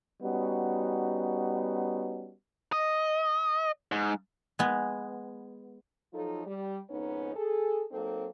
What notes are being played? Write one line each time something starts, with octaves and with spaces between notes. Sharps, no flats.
G3 B3 C#4 D#4 F#4
D#5
G#2
G#3 B3
F3 F#3 D#4 F4 A4
G3
F2 G#2 B3 C#4 D#4
G#4 A4
F#3 A#3 C4 D#4 A4